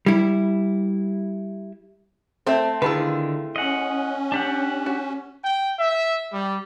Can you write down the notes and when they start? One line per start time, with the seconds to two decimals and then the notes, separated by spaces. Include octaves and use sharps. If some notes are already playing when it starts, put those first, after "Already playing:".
0.06 G3 E4
2.47 A3 C4 C5 E5
2.82 D3 D#3 E4 F4 G#4 B4
3.56 C#4 D#5 F#5
4.32 D4 G4 F#5
4.86 F#4
5.44 G5
5.79 E5
6.33 G3